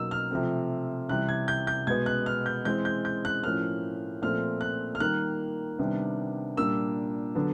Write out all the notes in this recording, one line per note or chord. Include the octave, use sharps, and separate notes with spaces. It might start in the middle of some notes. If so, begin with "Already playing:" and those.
Already playing: B2 F#3 A#3 D#4 E6
F6
C3 F3 A3 C4
C3 E3 G3 F#6
G#6
G6
G6
B2 G#3 B3 G#6
F#6
F6
G6
E3 G#3 C4 G6
G6
G6
F#6
A2 F3 A#3 C#4 F6
A#2 F3 A3 C4 F6
F#6
F6
D#3 G3 A#3 F#6
C3 D#3 G3 B3 D4
A#2 G3 A#3 D4 E6
D3 F#3 B3 D4